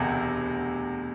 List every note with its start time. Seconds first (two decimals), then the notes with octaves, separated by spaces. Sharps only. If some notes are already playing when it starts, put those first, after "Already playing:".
Already playing: E1 D2 C3